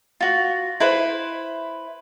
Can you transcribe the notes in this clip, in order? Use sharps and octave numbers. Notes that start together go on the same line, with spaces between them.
F4 F#4
E4 B4 C5